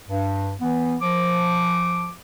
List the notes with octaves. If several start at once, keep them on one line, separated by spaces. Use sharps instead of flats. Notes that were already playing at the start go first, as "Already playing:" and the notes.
G2
E3 B3
F3 D6